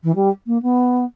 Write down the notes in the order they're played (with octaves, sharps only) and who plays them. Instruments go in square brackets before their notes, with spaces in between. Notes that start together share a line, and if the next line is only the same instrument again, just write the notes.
[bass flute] E3
G3
A#3
B3